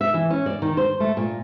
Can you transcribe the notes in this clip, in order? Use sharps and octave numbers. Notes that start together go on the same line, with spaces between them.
E5
E3
C#4
D5
D#3
C5
A3
A#2